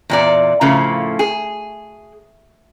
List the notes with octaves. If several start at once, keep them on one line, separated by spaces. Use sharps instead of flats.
E2 A#2 D5
A2 C#3 F3 A3 A#3
G#4